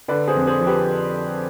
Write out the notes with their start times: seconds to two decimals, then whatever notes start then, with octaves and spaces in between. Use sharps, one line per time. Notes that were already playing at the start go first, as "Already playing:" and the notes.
0.08 D3 B4 D5
0.27 G#4 C5
0.35 F2
0.47 G#4 C5
0.60 F3
0.66 G4 B4